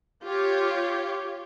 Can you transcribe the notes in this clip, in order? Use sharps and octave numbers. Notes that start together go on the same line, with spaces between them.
F4 G4 C#5